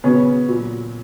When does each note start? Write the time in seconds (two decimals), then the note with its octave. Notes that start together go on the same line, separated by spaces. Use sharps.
0.04 C#3 F#3 B3 C#4
0.48 A#2 F#3